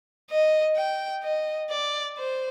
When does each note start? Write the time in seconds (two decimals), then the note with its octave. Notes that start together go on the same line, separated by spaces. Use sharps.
0.30 D#5
0.76 G5
1.24 D#5
1.70 D5
2.18 C5